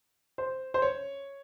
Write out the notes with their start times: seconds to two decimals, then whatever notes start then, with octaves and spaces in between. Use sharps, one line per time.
0.38 C5
0.74 C5
0.82 C#5